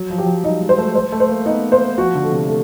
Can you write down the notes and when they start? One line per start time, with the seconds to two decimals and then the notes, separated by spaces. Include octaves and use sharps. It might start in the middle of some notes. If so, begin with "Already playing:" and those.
Already playing: F#3
0.10 F3
0.18 G4
0.26 F#3
0.44 G3 D#4
0.61 G#3
0.69 C5
0.78 A3
0.95 C5
1.12 A3
1.20 C5
1.29 A#3
1.46 B3 D#4
1.72 A#3 C5
1.98 F3 F#4
2.15 D3
2.24 A3
2.32 C3
2.48 A3